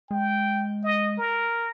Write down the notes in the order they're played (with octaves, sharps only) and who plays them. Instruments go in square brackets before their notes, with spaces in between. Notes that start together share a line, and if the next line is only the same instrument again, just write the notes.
[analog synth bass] G#3 [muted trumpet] G5
[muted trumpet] D#5
A#4